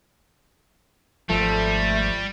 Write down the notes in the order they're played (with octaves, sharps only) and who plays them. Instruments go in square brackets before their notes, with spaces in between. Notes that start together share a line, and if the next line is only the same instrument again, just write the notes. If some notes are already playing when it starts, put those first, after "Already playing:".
[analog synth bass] G#1 [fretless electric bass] F3 [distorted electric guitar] G3 [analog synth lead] A3